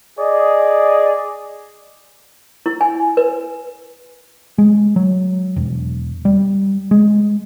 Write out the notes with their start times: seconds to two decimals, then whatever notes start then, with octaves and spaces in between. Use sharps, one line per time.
0.19 G#4 D5 D#5
2.66 E4
2.81 G#5
3.17 B4
4.58 G#3
4.96 F#3
5.56 E1
6.25 G3
6.91 G#3